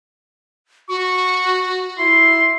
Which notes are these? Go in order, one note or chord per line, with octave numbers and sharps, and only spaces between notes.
F#4 C#6
E4 C6